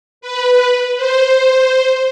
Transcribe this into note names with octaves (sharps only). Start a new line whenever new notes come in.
B4
C5